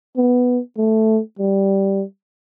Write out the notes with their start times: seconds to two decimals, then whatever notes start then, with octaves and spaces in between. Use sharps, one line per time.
0.17 B3
0.78 A3
1.39 G3